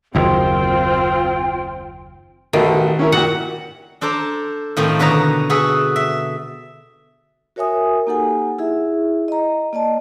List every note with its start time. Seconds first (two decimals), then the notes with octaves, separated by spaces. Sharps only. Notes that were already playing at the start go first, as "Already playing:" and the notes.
0.15 F#1 D#2 C4 F4 C5 G5
2.53 A1 B2 D#3 A4
2.99 C#4 E4 A#4
3.12 A#2 F#4 G4 F#5
4.01 D4 A4 C5 D5 A#5
4.77 A2 D#3 F3 C4
4.99 B2 D3 B4 C#5 A5 A#5
5.50 F#4 G#4 A4 B4 E5
5.96 E5
7.56 F#4 A#4 C#5 E5 G#5 D#6
8.07 A#3 D#4 G4 A4 F#5 G#5
8.59 E4 G#4 E5
9.28 D#5 A#5
9.73 A#3 D5 D#5 A5